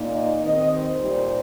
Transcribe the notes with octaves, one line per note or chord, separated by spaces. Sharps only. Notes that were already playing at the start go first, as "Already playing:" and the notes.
Already playing: A#2 A#3 D#4
D#5
D#2 D#3 C4 D#5
C5
A#2 G3 D#4